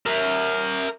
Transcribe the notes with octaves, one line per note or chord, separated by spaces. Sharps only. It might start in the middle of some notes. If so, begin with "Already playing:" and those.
A#4 E5